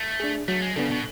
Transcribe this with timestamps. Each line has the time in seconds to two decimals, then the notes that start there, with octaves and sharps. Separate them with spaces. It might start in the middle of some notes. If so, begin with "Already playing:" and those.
Already playing: A3
0.20 D4 G#4
0.48 F#3 A3
0.62 G#3
0.76 C#3 B3 D4 A4
0.91 B2